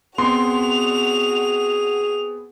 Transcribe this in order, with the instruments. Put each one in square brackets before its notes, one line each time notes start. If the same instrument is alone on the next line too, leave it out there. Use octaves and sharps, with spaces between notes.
[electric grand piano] B3 C4 [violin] F#4 F7 [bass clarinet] G#4 [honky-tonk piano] C6